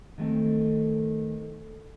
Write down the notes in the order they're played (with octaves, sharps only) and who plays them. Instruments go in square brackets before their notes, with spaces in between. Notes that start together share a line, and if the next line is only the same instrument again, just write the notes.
[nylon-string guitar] D#3 A3 C4